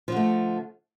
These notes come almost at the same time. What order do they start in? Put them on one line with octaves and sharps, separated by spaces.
F3 D3 A3